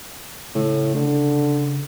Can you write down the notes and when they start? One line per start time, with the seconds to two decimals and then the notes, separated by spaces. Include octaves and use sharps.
0.55 A2 C#3
0.95 D3